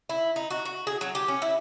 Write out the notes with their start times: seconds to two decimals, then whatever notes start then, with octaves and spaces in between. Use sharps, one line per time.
0.09 E4
0.36 D#4
0.51 F#4
0.65 F#4
0.87 G#4
1.01 F#3
1.15 G4
1.28 C#4
1.42 E4